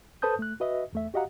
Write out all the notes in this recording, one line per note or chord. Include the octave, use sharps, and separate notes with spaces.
A4 B4 C5 A5 D#6 G6
A3 F#6
F#4 B4 D#5 E5
E2 A3 E5
F#4 G4 D#5 F5 F#5 A#5